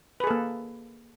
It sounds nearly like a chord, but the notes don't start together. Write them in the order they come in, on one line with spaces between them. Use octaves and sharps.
B4 G#4 A4 A#3